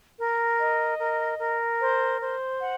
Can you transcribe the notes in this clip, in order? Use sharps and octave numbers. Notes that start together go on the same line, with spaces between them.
A#4
D#5
A#4
A#4
C5
C5
F#5